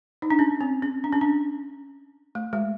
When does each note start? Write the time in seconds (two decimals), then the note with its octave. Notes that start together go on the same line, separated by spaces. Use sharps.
0.22 D#4
0.30 D4
0.39 C#4
0.61 C4
0.82 C#4
1.04 D4
1.13 C#4
1.21 D4
2.35 A3
2.53 G#3